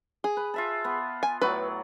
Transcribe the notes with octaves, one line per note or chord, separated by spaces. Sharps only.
G#4
B4
F4 E5 A5
B3
G#5
A2 F#3 B4 D5